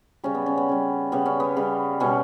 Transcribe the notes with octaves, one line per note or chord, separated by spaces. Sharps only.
C#3 G3 C#4
B3
C#4
B3
C#3 G3
C#3 G3 B3
C#4
B3
C#3 G3
B2 G3 C#4